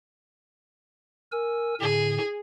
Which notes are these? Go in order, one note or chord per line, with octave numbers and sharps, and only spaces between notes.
A#4 G#5 E6
A2 D3 G#4